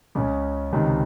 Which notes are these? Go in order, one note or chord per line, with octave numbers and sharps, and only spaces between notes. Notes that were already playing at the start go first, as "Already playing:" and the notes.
C#2 C#3 C#4
C#2 C3 D#3